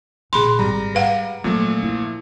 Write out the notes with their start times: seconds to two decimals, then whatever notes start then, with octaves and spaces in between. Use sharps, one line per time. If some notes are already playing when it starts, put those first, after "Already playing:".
0.33 A#2 D3 G#4 B5 C6
0.59 G#1 G3 A#5
0.95 G#2 B4 F5 F#5
1.44 A#2 F3 F#3 A3 C4
1.83 E4